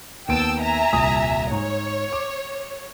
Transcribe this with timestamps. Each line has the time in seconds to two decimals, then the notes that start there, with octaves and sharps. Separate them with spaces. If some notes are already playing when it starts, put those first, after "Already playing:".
0.28 D#2 B3 G5 A5 E6 D7
0.61 E5 G#5 A#5
0.93 D#1 C2 D#6
1.51 G#2 C#5
2.13 D6